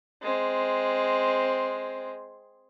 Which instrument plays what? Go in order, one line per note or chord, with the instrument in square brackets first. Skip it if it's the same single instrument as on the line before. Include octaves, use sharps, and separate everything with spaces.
[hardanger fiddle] G#3 C4